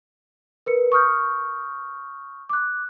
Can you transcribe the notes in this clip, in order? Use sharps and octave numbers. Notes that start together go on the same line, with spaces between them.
A#4 B4 C#7
C#6 D#6 F6 G6
D6 F#6